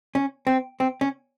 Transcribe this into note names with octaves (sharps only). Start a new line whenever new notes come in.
C#4
C4
C4
C#4